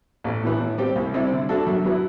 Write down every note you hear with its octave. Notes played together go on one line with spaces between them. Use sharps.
A1
A2 E3 B3
A2
G3 C4 G4
C2
C3 G3 C4 E4
D3
A3 D4 F#4 A4
F#2
F#3 B3 E4